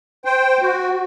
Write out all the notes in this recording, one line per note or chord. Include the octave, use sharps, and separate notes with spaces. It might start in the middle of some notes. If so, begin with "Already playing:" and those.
C5 G5
F#4